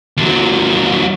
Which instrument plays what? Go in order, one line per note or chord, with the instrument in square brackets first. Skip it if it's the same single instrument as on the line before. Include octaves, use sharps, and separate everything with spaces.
[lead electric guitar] D#2 F#3